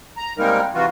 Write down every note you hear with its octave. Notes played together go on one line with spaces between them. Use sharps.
A#5
C3 G3 G#3 A#3 D#4 A#4
C3 E3 F4 F#4